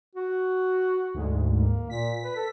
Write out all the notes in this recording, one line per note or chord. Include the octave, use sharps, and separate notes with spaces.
F#4
D2 G#2
A#3
A#2 B6
B4
A4